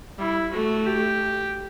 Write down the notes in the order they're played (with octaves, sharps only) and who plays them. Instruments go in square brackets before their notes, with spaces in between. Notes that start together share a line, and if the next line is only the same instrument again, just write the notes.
[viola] G3 [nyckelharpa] E4
[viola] A3 [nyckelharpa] F#4
[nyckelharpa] G4